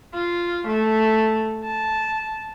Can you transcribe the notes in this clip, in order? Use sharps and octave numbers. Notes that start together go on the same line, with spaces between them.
F4
A3
A5